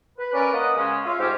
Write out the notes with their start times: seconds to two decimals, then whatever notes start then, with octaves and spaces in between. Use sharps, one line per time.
0.19 B4
0.33 C#4 A#4 B4 D5
0.53 A#3 D#5 F#5
0.76 C#3 G#3 C#4
1.05 F4 C#5 E5 F5
1.20 G#2 C4 C#4 G4